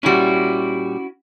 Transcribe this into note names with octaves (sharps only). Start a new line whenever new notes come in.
A#2 G3 C#4 E4 F#4